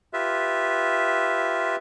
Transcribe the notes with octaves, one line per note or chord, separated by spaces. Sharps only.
F4 G4 B4 E5